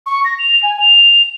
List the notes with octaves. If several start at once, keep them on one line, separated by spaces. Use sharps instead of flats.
C#6
A#6
F7
G#5
F7